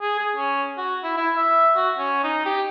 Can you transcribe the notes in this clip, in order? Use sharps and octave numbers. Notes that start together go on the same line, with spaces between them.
G#4
G#4
C#4
F#4
E4
E4
E5
F#4
C#4
D#4
G4